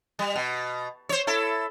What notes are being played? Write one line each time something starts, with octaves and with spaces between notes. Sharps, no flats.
G3
B2
C5 C#5
E4 A4